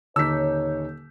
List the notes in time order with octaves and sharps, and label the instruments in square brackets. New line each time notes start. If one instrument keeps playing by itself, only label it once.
[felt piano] D#1 D#4 B6 [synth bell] D3 G6 [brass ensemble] C#5 [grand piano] E6